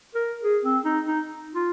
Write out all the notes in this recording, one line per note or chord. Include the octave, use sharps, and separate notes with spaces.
A#4
G#4
C4
D#4
D#4
F4